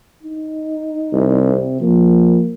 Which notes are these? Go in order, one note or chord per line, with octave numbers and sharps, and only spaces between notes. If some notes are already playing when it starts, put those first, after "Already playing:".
D#4
C2
C3
F3 A#3